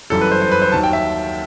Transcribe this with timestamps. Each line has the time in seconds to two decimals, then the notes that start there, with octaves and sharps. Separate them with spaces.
0.10 G1 F#2 E3 G3 A4
0.21 B4
0.31 C5
0.42 C5
0.51 B4
0.62 C5
0.72 D#2 D#3 F#3 A5
0.83 G5
0.93 E5